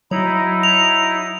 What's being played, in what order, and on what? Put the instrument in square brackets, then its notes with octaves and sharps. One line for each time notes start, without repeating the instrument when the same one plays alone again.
[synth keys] F#3 [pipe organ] D#4 E4
[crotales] F7